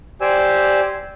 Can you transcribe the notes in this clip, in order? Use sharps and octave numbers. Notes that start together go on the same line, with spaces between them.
G4 C5 D5 G#5 E6